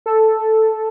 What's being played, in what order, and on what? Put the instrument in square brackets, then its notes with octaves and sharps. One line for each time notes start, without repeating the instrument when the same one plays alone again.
[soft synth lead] A4